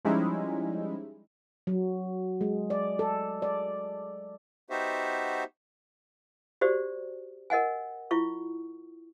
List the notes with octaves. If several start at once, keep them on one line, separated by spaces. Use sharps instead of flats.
F3 G3 G#3 C#4 D#4 E4
F#3
G#3
D5
A4
D5
B3 D#4 F#4 G4 C5 E5
F#4 G4 C5 D5
A#4 D#5 F#5 G#5
E4 F4 C#6